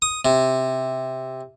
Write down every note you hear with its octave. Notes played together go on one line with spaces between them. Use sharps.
D#6
C3